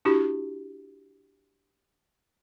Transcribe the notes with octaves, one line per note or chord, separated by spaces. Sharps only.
D4 E4 F#4 G4